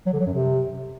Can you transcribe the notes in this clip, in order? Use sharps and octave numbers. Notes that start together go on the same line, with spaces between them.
F#3
D3
F#3
F#2
C3